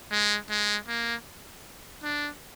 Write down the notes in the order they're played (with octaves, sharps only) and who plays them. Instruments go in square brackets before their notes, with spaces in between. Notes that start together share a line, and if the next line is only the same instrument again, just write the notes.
[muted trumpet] G#3
G#3
A#3
D4